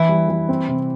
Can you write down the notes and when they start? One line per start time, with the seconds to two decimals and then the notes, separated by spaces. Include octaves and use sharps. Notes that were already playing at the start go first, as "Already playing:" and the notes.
Already playing: E3 E4
0.09 G3
0.29 E3
0.49 C4
0.68 C3